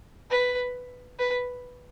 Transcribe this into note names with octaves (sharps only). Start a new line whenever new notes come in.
B4
B4